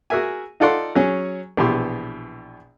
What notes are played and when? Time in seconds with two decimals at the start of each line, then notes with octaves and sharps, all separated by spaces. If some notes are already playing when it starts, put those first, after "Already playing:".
0.10 F#4 G#4 A#4 E5 G#5
0.60 D#4 F4 A4 D5 F#5 C6
0.95 F#3 C#4 G#4
1.57 A#1 B2 E3 G4 C6